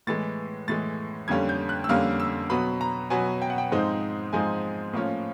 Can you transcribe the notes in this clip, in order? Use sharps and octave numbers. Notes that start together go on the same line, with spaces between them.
A2 E3 G#3 A6
A2 E3 G#3 A6
F2 D3 G3 A#3 C#4 G#6
G6
F#6
E6
F2 D3 G3 A#3 C#4 F6
E6
B2 F#3 B3 B5
A#5
B2 F#3 B3 G#5
G5
F#5
G5
G#2 F3 G#3 C4 D#4
G#2 F3 G#3 C4 D#4 G#5
A2 F3 A#3 C#4 F4